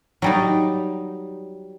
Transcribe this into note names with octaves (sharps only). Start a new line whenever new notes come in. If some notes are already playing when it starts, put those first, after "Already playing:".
F#3 G3 D#4